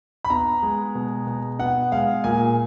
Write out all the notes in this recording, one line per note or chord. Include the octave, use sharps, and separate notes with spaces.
B5
B3 A#5
G#3
B2
B2
B3 F#5
G#3 F5
A#2 G#5